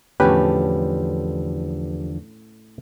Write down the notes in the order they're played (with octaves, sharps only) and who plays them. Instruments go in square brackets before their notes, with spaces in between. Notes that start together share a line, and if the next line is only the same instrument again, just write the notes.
[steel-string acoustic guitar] E2 D3 F3 [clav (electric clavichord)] A2 C#4 [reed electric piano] G4 B4